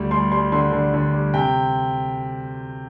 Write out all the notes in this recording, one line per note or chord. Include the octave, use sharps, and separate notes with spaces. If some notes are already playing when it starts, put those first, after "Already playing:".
Already playing: D2 G3
G3 C6
G3 C6
D3 C6
D3
D3
G3
C3 G5